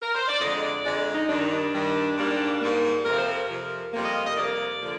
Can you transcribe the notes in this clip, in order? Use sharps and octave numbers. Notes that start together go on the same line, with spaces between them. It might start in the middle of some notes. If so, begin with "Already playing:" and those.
A#4
C5
D5
F2 D3 G#3 D#5
D5
F2 D3 G#3 D5
D#4
G2 D#3 G3 D4
D#4
D4
G2 D#3 G3
G#2 G3 A#3
G#2 G3 A#3
F2 C3 F3 A#4
C5
A#4
F2 C3 F3
F2 C3 G3 A#3
D#5
F5
D#5
F2 C3 G3 A#3 D5
D3 F3 A#3